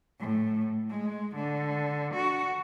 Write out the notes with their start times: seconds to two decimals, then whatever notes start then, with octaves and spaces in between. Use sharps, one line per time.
0.20 A2
0.90 G#3
1.36 D3
2.14 F#4